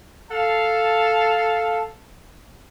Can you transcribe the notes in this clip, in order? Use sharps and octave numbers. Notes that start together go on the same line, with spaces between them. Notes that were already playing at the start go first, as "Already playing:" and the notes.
A4 F5 A5